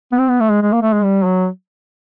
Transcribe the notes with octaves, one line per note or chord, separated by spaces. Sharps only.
B3
C4
B3
A3
G#3
G#3
A#3
A3
G#3
G3
F#3